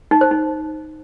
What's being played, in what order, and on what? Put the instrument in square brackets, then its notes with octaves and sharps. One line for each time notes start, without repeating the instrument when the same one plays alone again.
[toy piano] D#4
C5
D#4